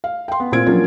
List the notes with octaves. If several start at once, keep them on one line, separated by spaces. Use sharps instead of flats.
F5
G5 C6
B3
A#2 C4 F4 G#6 D7
F3 F#3 A#3 C#4 D4 F4